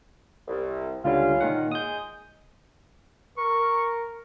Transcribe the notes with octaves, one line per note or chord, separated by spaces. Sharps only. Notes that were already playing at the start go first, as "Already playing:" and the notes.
C2
C#2 D3 G3 C#4 F4
A#2 D#3 F#5
G#3 D#6 G6
A#4 C#6